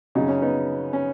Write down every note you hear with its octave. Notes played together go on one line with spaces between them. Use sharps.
F#2 C#3 F#3 D#4
C#4
B3 D#4
C#4